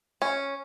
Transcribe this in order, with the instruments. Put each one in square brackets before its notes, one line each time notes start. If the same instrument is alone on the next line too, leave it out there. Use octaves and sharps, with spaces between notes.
[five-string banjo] C#4